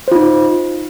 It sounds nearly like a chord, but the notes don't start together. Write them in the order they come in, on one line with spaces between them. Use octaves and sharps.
C5 F4 D#4